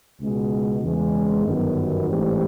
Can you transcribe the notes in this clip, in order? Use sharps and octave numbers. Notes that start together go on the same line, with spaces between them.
C#2 B2 G#3
E2 C#3 E3 G#3 C#4
G1 F#2 D#3 F#3 B3
A1 G#2 E3 G3 C4